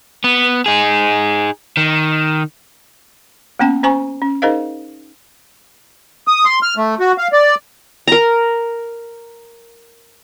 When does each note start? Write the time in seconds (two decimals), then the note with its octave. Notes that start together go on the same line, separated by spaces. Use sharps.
0.24 B3
0.66 D#4 G#4
1.77 D#3
3.59 A#3 B3 C#4 G5 A5
3.83 C#4 C5 G#5 A#5 C#6
4.22 C#4
4.42 D#4 G#4 A#4 C5 D#5 F5
6.28 D#6
6.45 C6
6.63 F6
6.77 A3
7.00 F#4
7.18 F5
7.33 D5
8.08 A#4 A#5